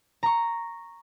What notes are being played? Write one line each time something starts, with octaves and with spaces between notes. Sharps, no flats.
A#5 C#6